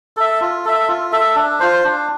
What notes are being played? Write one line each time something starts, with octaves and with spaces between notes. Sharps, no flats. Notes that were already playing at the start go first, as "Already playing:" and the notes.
A4 E5
F4
A4 E5
F4
A4 E5
D4
F4 C5
D4